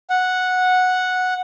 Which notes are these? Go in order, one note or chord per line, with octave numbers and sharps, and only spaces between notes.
F#5